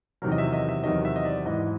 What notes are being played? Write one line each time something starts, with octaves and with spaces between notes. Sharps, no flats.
E2 C3 D#3 F#3 A#4
D#5
E5
D#5
E5
E2 C3 D#3 F#3 D#5
E5
D#5
D5
G#2 E3 D#5